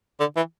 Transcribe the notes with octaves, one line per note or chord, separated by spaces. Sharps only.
D3
E3